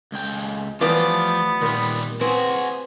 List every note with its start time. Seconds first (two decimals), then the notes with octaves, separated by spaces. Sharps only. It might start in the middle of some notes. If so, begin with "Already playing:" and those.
0.12 C#2 G5
0.81 E3 F3 G3 A3 B3 F4 D5 D#6
1.61 D#2 A#2 G3
2.21 B3 C4 E4 F#4 G#4